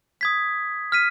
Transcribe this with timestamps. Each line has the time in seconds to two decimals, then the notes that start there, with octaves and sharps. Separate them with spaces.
0.21 D#6 G#6 B6
0.92 F6 B6 D#7